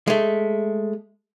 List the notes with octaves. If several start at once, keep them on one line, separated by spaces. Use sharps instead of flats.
G#3 A3